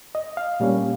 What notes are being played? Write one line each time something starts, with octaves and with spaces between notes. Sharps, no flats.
D#5
F5
A#2 G3 A#3 C#4